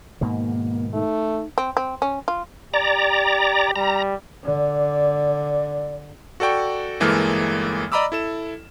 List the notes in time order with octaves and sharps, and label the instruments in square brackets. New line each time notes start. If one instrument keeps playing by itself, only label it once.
[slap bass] G#2 B2 D#3 [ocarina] A#3
[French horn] A3 [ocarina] D#4
[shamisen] C4
C4
C#4
F4
[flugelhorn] G4 [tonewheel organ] D5 A#5
[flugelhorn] G3 [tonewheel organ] A#5
[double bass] D3 [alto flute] D5
[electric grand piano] F#4 A4 D5 G5 C#6
G1 E3 G#3 A#3 A4 F6
D5 D#5 A#5 B5 D6 E6
E4 A4 E7